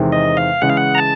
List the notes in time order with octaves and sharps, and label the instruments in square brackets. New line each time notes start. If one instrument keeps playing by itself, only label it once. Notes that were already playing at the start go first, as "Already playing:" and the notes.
Already playing: [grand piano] E2 C3 D#3 G#3 C4
[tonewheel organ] D#5
F5
[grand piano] C#3 E3 G#3 [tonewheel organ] F#5
[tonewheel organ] F5
F#5
A#5
A5